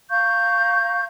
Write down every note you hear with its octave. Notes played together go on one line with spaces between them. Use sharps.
F5 A#5 C#6 G6